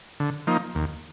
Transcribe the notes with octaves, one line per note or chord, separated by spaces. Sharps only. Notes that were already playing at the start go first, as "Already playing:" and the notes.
D3
F3 A#3 D#4
D#2